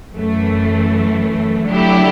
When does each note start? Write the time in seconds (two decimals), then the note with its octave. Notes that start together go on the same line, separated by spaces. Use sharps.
0.14 F#2 E3 A3
1.68 D3 F#3 A3 E4 G4